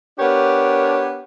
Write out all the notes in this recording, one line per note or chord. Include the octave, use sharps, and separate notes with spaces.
B3 D4 G4 A#4 C#5